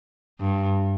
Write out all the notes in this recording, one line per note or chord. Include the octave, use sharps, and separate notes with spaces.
G2